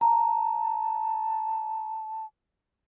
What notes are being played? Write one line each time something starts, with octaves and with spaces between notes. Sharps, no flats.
A5 A#5